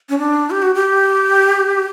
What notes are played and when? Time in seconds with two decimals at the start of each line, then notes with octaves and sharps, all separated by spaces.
0.09 C#4
0.19 D4
0.50 G4
0.62 F#4
0.75 G4